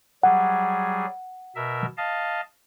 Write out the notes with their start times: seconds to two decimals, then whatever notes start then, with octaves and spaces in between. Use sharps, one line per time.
0.23 F#3 G3 G#4 F#5
1.56 B2 A#4 E5
1.97 D#5 F5 A5